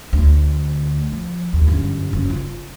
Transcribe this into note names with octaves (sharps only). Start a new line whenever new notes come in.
D2
F3
D#2
G1 F#2
F#1
F4